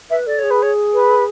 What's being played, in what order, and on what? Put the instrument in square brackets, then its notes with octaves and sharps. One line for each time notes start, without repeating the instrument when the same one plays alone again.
[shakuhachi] B4 [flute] E5
[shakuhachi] A4 [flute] D5
[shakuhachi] G#4 [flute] C#5
[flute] B4
C#5
B4